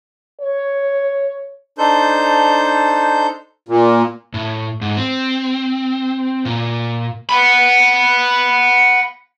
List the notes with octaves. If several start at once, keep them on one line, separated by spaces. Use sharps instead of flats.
C#5
D4 D#4 A4 C5 G6
A#2
A2
G#2
C4
A#2
F#5 B5